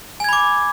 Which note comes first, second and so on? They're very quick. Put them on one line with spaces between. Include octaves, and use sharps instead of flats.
G#5 G#6 B5 D6